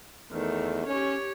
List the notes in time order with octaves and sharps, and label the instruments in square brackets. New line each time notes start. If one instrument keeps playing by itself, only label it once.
[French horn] E2 [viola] D#3 A3
[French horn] C#4 [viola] G4 C#5